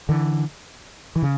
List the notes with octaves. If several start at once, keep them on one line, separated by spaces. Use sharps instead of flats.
D3 E3
E3
C#3